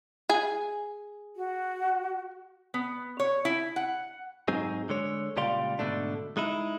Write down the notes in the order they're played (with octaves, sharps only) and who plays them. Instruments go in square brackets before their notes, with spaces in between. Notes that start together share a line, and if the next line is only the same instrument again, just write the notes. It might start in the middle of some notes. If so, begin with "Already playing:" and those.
[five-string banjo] G#4 G#5
[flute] F#4
[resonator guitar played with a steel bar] B3
C#5
E4
F#5
[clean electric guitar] G#2 F#3 C4 D#4 G#4
D3 G#3 C#5
C#2 A#2 G3 D5 F5 C6
G#2 B2 D3 A3 D4
G#3 D#4 E4